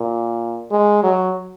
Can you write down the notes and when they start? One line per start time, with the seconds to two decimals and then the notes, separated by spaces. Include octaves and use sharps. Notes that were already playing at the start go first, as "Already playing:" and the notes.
Already playing: A#2
0.71 G#3
1.03 F#3